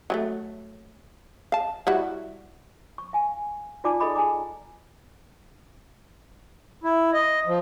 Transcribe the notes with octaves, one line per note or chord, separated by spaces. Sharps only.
F#3 G3 A3
F5 A5
G3 E4 F#4
C#6
F5 G#5
D#4 F4 D5 G#5 A5 D6
G#4 A4 D#5 B5 D6
G#4 G#5 A#5 D6
E4
D#5
F3